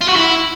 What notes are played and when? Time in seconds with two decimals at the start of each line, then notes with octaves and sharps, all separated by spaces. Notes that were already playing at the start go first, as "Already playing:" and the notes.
0.01 F4
0.08 F#4
0.16 E4